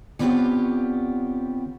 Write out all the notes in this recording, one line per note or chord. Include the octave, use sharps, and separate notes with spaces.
D3 B3 C4 F4 G4 C#5